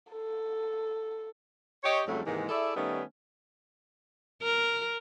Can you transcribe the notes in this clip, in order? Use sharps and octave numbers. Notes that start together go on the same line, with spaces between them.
A4
G4 C#5 D#5
F2 G#2 C#3 F#3 G3 A3
G#2 C3 D#3 E3 G#3 A#3
E4 G#4 A4 D5 E5
D#3 G3 A3 B3 C#4 D#4
A#4